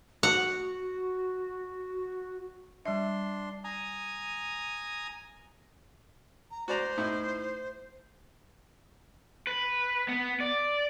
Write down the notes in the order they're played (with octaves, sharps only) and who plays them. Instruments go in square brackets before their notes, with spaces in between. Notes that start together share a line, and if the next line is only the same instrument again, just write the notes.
[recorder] F#4 [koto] F#5
[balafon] G3 E5 [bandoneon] D4 C6
[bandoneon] G#5 A#5 D#6
[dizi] A#5
[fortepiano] F#4 D5 A#5 [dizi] C5
[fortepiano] A2 D#4 E4
[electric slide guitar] B4
B3
D5